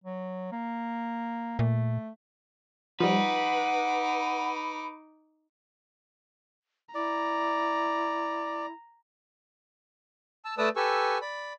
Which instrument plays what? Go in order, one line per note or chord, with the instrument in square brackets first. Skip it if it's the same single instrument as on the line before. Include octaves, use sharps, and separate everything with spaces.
[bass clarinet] F#3
A#3
[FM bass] A#2 [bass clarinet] A3
[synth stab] F3 G3 [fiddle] D#4 D6 [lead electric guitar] B4 [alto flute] F#5
[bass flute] E4 [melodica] D5 [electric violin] A#5
[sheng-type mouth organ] A5 E6
A3 B4 D5 A5 D#6 E6
G4 A4 B4 G#5 C#6 E6
D5 B5